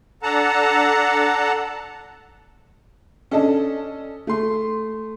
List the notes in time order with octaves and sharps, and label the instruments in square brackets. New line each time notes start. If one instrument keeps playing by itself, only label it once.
[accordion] D4 A4 F#5 A5 A#5
[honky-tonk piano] C#4 D4 A4 D#5 A5
A3 C6